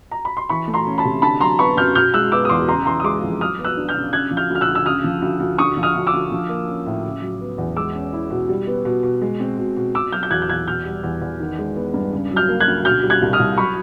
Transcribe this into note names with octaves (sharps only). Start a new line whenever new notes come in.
A#5
B5
C6
E3 B5 C#6
A3
A#5 C6
C#4
A5 B5
C3
D3 A5 B5
F#3 A#5 C6
B3 B5 C#6
F#2 F6 G6
B2 F6 G6
G#3 E6 F#6
B3 D6 E6
D#6
E2 C6 D6
C#3 A#5 C6
E3 A#5 C6
D#6
G#3 C6 D6
F2
F#3 D#6 F6
B3
E6 F#6
D4
F6 G6
C#3
C#3 F#6 G#6
F3
F6 G6
D2
F6
E6 F#6
D2
E6
C#3 D#6 F6
F3
D2
D2
D3 C#6 D#6
F3
D#6 F6
D2
D6 E6
D2
F3
A#3
C#4
A2
C#3
F#3
B3
E2
G#3 D6 E6
C#4
E4
B2
G3
B3
B2
B2
G#3
C4
B2
B2
B2 D6 E6
F#3 F6 G6
G6
E2 F#6 G#6
G6
E2 F#6 G#6
B2 F6 G6
G3
E2
E2
D#3
G#3
B3
G2
C#3
F#3
F6 G6
A#3
F#6 G#6
D2
B2 F6 G6
G3
F#6 G#6
C2
D#6 F6
C2
F#3 B5 C#6